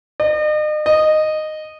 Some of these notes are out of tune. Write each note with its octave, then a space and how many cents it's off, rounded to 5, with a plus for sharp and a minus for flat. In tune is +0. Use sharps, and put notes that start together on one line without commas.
D#5 -40
D#5 -10